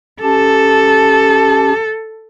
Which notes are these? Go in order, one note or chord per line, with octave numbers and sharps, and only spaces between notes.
C#4 G4 A4 A5